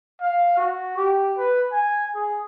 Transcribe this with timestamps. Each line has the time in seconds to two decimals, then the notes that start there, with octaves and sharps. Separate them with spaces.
0.21 F5
0.57 F#4
0.97 G4
1.38 B4
1.72 G#5
2.15 G#4